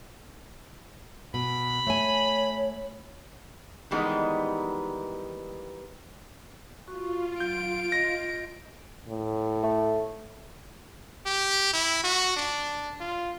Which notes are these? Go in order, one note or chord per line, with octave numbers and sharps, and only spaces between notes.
B2 B5
A3 C#5 G#5
D#3 E3 G3 G#3 B3 D#4
F4 F#4 C#6
F#3 G6 D7
D#5 A#6
A2
A3
G4
E4
F#4
D4
F4